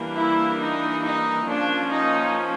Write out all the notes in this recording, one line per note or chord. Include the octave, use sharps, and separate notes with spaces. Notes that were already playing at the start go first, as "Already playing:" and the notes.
Already playing: E3 G3 A#3 D4
E4
D#4
D#4
F3 A#3 C#4 D4
D#4